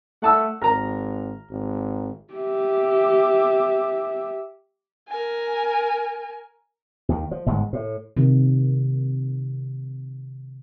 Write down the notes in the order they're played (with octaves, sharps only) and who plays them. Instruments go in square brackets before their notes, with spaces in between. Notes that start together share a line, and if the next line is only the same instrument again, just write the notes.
[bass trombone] A3 [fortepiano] F#5 A5 E6
[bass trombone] G#1 [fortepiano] A#4 A#5
[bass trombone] G#1
[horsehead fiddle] G4 E5
[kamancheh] A#4 G#5
[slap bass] D#2 D#3
F3
G1 G#2 D#3 G#3
A2
[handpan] C3 D#3